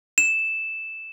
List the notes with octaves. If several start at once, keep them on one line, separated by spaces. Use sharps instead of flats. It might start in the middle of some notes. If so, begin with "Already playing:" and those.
E7